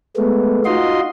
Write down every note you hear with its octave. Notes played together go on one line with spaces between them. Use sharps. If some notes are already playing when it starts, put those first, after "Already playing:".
G#3 A3 B3
D#4 F4 F#4 D#5 C6